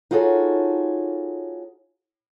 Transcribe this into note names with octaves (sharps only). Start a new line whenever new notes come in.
D#4 F4 F#4 G#4 A4 C#5